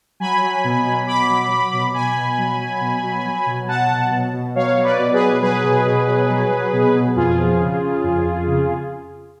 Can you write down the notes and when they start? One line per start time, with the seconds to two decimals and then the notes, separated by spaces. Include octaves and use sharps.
0.20 F#3 G#5 B5
0.42 F#3
0.64 B2
0.86 F#3
1.07 B2 B5 D6
1.29 F#3
1.50 F#3
1.73 B2
1.94 B2 G#5 B5
2.16 B2
2.38 F#3
2.59 F#3
2.81 B2
3.03 F#3
3.24 F#3
3.46 B2
3.68 F#3 F#5 A5
3.90 B2
4.11 B2
4.33 B2
4.55 F#3 C#5 F5
4.76 F#3
4.84 B4 D5
4.99 B2
5.13 G#4 B4
5.20 B2
5.42 F#3 G#4 B4
5.64 B2
5.85 B2
6.07 F#3
6.29 F#3
6.51 F#3
6.73 B2
6.94 B2
7.16 F2 F4 G#4
7.37 F3
7.59 C#3
7.81 C#3
8.04 F2
8.24 F2
8.46 C#3